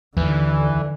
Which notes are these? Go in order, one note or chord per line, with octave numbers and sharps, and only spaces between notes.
D#2 D3 E3